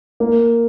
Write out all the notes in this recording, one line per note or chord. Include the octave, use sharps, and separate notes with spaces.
A#3